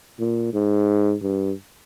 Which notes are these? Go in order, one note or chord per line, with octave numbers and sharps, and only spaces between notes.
A#2
G#2
G2